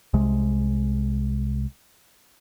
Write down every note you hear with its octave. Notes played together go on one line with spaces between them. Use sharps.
C2 C3 G#3